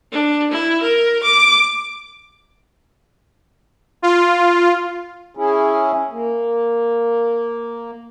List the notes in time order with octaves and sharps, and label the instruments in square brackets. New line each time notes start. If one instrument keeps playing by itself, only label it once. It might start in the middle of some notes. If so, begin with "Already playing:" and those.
[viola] D4
E4
A#4
D6
[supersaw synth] F4
[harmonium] C#4 E4 G#4
A#3